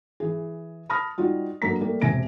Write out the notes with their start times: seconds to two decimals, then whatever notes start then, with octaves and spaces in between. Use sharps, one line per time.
0.20 E3 G#4
0.90 A5 B5 D#6 F6 A#6
1.18 G3 D#4 F4 F#4
1.62 G2 F#3 A3 A#3 A#5 B6
1.81 G3 A3 A#3
2.01 E1 C3 G#5 A#6 D7